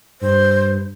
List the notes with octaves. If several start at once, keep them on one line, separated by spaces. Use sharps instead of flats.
G2 C5